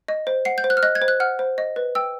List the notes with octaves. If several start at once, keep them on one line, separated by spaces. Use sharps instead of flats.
D#5
C5
F#5 C7
G6
C5
F#6
F6
D#5 F#6
G#6
C5
F#6
F#5 F6
C5
D#5
B4
G5 E6